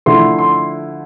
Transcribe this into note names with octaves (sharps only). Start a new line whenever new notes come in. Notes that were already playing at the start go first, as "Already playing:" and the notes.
D3 F3 A3 E4 C6
C6